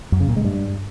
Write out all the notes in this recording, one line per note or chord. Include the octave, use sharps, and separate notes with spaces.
F#2
C#3
A#2
G#3
G2